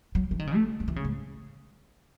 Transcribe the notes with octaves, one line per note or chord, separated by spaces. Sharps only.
F#3
E3
D#3
C#3
A3
F#3
E3
C#3
G#2